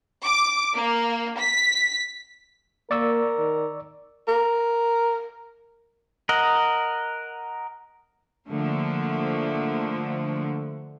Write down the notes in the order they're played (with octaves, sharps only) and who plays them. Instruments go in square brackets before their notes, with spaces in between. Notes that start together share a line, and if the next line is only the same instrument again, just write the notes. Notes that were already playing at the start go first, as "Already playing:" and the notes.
[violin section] D6
A#3
B6
[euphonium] A#3 [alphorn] A#4 [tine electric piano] D5 C#6 E6
[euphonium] D#3
[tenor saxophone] A#4
[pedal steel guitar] A#4 D#5 F#5
[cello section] D3 F3 A3 A#3